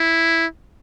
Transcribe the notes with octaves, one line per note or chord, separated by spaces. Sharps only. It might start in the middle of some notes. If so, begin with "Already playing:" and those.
Already playing: E4